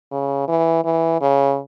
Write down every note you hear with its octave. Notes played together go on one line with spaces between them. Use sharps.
C#3
E3
E3
C#3